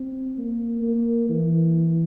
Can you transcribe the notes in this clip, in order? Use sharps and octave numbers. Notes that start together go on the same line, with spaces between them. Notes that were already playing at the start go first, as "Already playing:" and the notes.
Already playing: C4
A#3
A#3
E3